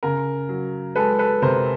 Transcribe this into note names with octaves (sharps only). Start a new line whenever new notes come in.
C#3 A#4
F#3
G#3 A4 B4
A4 B4
C3 A#4 C5